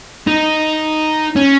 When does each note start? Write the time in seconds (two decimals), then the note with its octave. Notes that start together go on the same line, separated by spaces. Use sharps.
0.28 D#4
1.36 C#4